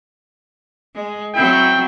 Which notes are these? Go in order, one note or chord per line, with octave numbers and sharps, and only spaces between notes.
G#3
F#3 C4 E4 G5